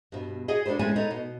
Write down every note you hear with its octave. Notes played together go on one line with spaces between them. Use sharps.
G2 B2
F#4 G#4 D#5
D4 F#4 A4 B4 C5
A2 G#3 C4 C#4 A4 G#5
D#4 A4 B4 C#5
B2